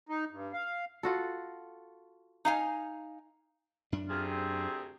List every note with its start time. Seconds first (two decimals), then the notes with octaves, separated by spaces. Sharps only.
0.09 D#4
0.31 G2
0.53 F5
1.03 F4 F#4 A4
2.45 D#4 F5 G#5
3.92 F#2 D4
4.09 D2 C3 F4 G#4
4.30 C4